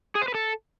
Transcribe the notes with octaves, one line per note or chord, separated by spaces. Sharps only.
G#4
C5
B4
A4